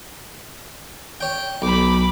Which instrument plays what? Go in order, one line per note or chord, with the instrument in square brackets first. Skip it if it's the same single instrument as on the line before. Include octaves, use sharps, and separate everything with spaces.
[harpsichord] C#5 G5
[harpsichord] B1 [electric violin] B5 D6